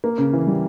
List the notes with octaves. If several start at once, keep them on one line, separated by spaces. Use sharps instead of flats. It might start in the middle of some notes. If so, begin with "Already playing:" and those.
A#3
C#3
E3
G3